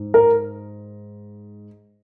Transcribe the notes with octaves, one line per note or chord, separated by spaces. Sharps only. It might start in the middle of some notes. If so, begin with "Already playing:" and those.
Already playing: G#2
A#4